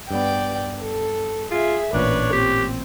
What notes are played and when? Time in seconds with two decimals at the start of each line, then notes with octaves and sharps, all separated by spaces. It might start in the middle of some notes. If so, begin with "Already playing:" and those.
0.11 G2 B3 D5 G5
0.81 A4
1.51 F4 G#4 E5
1.93 A1 A#2 D4 B4 C#5
2.33 C4 G4